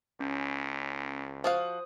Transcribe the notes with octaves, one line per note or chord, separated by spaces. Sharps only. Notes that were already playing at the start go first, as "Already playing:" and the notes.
C#2 C#4
F3 F#4 C5 F5 D#6